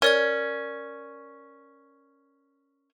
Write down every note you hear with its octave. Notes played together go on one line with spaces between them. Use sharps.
C#4 A#4 D5 G#6